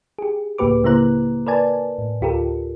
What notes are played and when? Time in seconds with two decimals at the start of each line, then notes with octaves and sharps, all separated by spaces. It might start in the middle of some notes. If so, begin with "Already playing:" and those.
0.18 G4 G#4
0.58 C#2 A2 A#3 G4 B4 D6
0.84 C#3 A#3 E4 C5 A#5 F#6
1.47 A#4 B4 D5 G#5 A5
1.99 A2
2.21 D2 F4 G4 A4 A#4